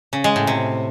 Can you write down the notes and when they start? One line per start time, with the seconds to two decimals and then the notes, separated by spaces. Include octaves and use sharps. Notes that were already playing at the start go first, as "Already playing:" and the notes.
0.13 C#3
0.24 G#3
0.36 A2
0.47 C3